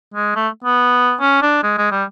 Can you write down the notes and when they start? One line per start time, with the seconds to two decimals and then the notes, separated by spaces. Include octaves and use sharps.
0.14 G#3
0.36 A3
0.64 B3
1.21 C#4
1.42 D4
1.63 G#3
1.78 G#3
1.91 G3